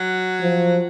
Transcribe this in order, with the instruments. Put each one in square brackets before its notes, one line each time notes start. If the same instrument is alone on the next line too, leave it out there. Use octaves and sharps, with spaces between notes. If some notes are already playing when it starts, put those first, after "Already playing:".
Already playing: [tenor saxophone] F#3
[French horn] F3